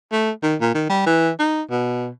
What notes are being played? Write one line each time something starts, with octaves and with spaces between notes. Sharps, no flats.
A3
D#3
A#2
D#3
G3
E3
D#4
B2